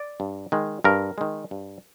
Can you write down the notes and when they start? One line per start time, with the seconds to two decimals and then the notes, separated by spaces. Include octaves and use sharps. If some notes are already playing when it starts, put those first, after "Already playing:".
Already playing: D5
0.20 G2
0.52 D#3 G#3
0.84 G2 A#4
1.18 D#3 G#3
1.51 G2